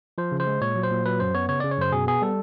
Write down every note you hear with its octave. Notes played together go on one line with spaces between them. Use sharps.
F3 C5
C#3
C5
G#3
A#2 C#5
F#3
C5
A#2
F#3 B4
F#2 C5
B3 C#5
C#3 C#5
C#3 D5
C#5
F#2 C5
B2 G#4
B3 G#4
G3 A4